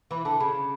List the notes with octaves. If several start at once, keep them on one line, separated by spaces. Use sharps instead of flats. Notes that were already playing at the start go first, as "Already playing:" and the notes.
E3 B5
D3 A5
C#3 B5
B5